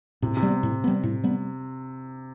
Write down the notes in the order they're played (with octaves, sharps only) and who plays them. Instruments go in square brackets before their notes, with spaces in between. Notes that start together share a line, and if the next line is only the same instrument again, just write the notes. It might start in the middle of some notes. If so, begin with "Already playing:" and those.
[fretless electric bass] A2 [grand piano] C3
[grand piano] C3
[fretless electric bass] G3 B3
A2
G3 B3
A2
G3 B3